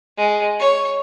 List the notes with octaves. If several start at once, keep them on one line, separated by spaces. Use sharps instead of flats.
G#3
C#5